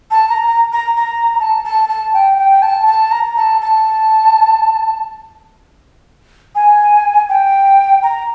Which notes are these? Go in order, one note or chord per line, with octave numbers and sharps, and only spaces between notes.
A5
A#5
A#5
A#5
A#5
A5
A5
A5
G5
G5
A5
A5
A#5
A5
A5
G#5
G5
A#5